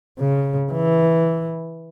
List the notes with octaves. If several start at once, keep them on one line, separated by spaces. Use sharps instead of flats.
C#3
E3